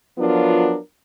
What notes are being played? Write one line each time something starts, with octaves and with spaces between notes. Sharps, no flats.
F3 F#3 B3 D4 F4 A#4